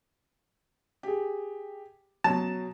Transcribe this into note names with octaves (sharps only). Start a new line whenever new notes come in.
G4 G#4
B2 F#3 A5